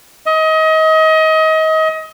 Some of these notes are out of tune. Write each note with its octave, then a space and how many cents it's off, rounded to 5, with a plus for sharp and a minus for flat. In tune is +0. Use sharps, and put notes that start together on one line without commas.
D#5 +30